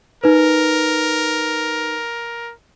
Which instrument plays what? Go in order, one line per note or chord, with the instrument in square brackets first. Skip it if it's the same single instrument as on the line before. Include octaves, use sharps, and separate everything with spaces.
[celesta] D#4 B4 [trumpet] A#4